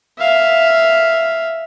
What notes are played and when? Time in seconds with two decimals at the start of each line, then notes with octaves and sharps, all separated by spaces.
0.19 E5 F5